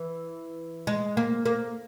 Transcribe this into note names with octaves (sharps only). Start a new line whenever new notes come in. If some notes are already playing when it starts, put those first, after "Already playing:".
Already playing: E3
G#3
A#3
A#3